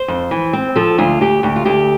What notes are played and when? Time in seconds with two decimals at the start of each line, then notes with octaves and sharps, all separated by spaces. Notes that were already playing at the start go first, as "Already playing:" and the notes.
Already playing: C5
0.08 F2
0.31 E3
0.53 C4
0.76 F3 A4
0.98 D2 F4
1.21 D2 G4
1.43 D2 G4
1.56 F4
1.65 D2 G4